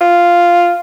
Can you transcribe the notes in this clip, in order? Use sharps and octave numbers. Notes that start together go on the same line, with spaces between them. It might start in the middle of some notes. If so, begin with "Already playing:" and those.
F4